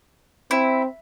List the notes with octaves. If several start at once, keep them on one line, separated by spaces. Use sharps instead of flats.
C4 E4